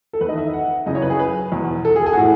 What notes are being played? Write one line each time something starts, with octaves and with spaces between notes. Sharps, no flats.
A4
E2 B4
D#3 D#5
E5
F#5
F#2 C#3 E3 D#5
C#5
B4
G#4
B4
E2 B2
A4
G#4
G#4
F#4
A2 E3